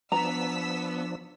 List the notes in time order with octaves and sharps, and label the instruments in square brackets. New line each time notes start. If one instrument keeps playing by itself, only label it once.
[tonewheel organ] F3 D4 [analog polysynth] B3 [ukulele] A#5 [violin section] E6 B6